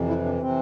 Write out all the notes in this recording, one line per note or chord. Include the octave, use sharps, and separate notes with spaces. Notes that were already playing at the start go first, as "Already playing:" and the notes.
Already playing: F2 C3 E3
E4
D4
C3 E3 C4